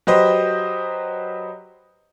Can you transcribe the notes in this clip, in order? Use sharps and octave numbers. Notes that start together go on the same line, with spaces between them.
F#3 G4 B4 C5 D#5